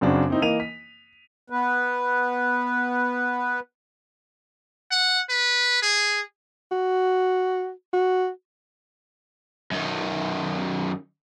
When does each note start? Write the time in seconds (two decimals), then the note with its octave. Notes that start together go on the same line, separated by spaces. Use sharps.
0.01 F#2 C#3 C4 D4 F#4
0.30 C4 D#4 E4
0.42 E3 A#3 D#5 D#7 F7
0.60 B6
1.50 B3 B4
4.91 F#5
5.29 B4
5.82 G#4
6.71 F#4
7.93 F#4
9.71 F#2 D#3